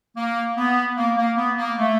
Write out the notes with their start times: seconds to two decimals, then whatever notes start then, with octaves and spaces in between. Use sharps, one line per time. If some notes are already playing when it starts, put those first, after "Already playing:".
0.17 A#3
0.57 B3
0.97 A#3
1.17 A#3
1.37 B3
1.58 A#3
1.78 A3